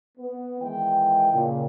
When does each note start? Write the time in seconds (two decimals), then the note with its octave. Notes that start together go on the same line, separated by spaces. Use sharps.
0.18 B3
0.61 D#3 E3 G#3 G5
1.32 A#2 C#3